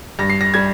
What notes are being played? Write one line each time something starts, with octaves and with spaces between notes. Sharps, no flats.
G2 A#6
C7
A#6
G3 G#6